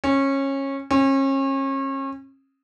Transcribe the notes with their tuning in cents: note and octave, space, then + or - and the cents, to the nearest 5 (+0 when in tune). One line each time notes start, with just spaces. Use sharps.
C#4 -20
C#4 -35